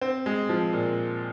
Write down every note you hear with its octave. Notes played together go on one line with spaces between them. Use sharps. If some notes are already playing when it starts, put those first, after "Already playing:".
C4
G#3
F3
A#2